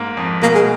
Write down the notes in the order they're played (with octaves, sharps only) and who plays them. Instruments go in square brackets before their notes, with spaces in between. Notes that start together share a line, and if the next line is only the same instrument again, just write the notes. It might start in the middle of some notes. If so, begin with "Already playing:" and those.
Already playing: [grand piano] G#2 A#3
F2
[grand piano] B2 [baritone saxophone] A#3
[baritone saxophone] G#3